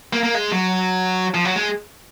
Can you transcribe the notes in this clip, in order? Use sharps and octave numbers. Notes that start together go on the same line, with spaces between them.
A#3
A#3
G#3
F#3
F3
F#3
G#3